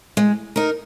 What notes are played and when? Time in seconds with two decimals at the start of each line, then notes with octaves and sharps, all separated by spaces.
0.17 G#3
0.56 D#4 A#4